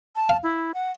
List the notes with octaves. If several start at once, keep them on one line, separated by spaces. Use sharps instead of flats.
A5
F5
E4
F#5